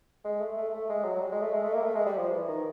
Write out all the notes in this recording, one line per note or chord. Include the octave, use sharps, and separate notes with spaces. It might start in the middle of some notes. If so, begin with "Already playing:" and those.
G#3
A3
A3
A3
G#3
F#3
F#3
G3
G#3
A3
G#3
A3
A#3
A3
G#3
G3
F3
E3
D#3